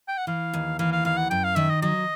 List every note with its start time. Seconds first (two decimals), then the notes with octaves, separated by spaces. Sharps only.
0.08 G5
0.17 F#5
0.27 E3 F5
0.54 D#2
0.79 E3 F5
0.92 F5
1.05 D#2 F5
1.17 F#5
1.30 F#2 G5
1.44 F5
1.56 D#3 E5
1.69 D#5
1.82 F#3 D#5